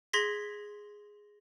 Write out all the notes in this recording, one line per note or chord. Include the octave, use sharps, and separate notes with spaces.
G#4 C6 G#6 A#6 B6